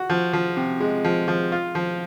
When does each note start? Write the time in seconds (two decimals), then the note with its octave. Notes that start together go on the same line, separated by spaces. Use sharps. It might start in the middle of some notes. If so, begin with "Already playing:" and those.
Already playing: F#4
0.10 F3
0.33 F3
0.57 C3
0.80 G#3
1.04 F3
1.28 F3
1.52 F4
1.75 F3